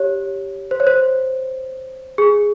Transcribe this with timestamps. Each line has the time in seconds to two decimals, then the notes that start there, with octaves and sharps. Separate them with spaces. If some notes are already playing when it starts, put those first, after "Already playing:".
Already playing: G4 C#5
0.71 C5
0.80 C#5
0.87 C5
2.18 G#4